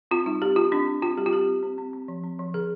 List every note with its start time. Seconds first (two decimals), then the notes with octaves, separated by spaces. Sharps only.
0.11 C4 F4
0.26 G3 D#4
0.42 C4 G4
0.56 C4 F4
0.72 C4 D4
0.87 C4
1.02 C4 F4
1.17 G3 G4
1.26 F4
1.33 C4 G4
1.48 C4
1.63 C4
1.78 C4
1.93 C4
2.08 F3
2.23 C4
2.39 F3
2.54 D3 G#4